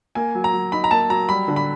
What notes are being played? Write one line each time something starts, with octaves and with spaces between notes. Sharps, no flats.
A#3 G#5
F#3
A#5
F#3
D#4 B5
A#5
A#3 A5
F#3 A#5
G3 B5
D3
B5